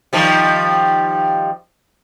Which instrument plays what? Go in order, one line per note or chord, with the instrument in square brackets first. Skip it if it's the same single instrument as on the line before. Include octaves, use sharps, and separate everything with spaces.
[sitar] D#3 F3 G3